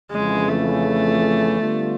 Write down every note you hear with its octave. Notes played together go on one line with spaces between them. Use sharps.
F2 C#3 E3 G#3
A3
D3 G3 B3 D4 F4